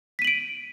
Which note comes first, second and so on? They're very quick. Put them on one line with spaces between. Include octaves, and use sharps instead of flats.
B6 D#7 F#7 D7